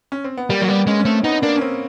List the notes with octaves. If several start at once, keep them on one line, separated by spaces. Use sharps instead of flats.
C#4
C4
B3
G3 A#3
F#3 A#3
G3 B3
G#3 C#4
C#4
A3 C4
B3 D#4
A#3 D4
C#4
C4